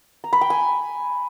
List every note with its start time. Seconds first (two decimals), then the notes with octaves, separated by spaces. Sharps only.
0.24 A#5
0.33 B5
0.41 G5
0.50 G#5